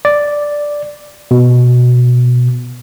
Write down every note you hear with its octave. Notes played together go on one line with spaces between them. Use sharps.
D5
B2